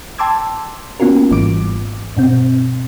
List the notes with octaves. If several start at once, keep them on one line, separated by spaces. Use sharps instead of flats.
G5 A5 C6 D6 E6 G#6
A#3 B3 C#4 F4 F#4 A#4
G#1 G#2 E3 G3 D6 D7
G2 B2 C4